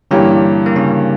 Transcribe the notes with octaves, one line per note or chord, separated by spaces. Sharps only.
G2 D3 E3 A#3 C#4 D4 G4
A#3
C#3 C#4